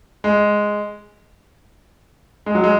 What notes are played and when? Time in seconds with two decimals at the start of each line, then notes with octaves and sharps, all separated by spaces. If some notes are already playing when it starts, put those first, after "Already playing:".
0.24 G#3
2.46 G#3
2.55 F#3
2.64 G#3